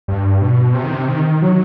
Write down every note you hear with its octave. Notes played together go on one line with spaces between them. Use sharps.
G2
B2
C3
D#3
C3
D#3
F#3